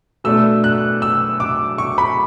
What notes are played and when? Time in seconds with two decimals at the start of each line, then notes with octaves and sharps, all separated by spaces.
0.24 B2 A3 D4 E6
0.64 F#6
1.02 E6
1.40 D6
1.78 C#6
1.98 B5